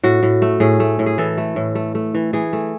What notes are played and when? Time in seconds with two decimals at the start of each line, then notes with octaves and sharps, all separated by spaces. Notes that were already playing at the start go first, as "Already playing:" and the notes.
0.03 A2 F#4
0.23 A2
0.42 A3
0.60 A2 G#4
0.80 A3
0.99 A2
1.06 G#4
1.18 E3 A4
1.38 A3
1.56 A2
1.75 A3
1.95 A3
2.15 E3
2.33 E3 G#4
2.53 A3